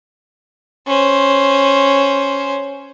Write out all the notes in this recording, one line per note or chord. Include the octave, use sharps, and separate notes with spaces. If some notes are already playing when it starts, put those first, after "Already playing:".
C#4 C5